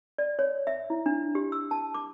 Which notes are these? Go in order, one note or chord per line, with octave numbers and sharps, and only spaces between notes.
D5
C#5
E5
E4
D4
G4
E6
A5
D6